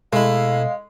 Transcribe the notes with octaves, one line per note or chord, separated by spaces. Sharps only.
B2 G#3 A3 E4 F5